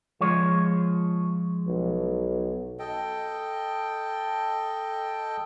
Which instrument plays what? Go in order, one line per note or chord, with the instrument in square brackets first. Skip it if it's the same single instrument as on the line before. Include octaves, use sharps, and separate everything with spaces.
[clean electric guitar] F3 G#3 C#5
[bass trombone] B1
[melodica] A4 D#5 G5